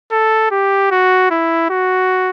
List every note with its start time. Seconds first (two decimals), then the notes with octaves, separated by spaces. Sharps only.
0.12 A4
0.51 G4
0.91 F#4
1.31 E4
1.70 F#4